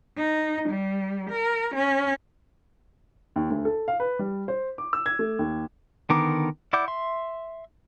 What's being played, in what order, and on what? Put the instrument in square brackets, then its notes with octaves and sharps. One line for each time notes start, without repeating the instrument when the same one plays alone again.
[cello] D#4
G3
A#4
C#4
[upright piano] D#2
D2
A4
F5
B4
G3
C5
D6
E6
G#6
A3
D#2
[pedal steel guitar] D3 D#3 B3 A#4 D6
E4 D5 F#5 D6 G6
E5 C6